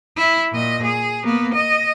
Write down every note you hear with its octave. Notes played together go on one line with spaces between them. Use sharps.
E4
A#2 D#5
G#4
A#3 B3
D#5